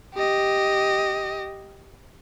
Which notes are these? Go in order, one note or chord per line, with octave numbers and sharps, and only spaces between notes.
G4 D#5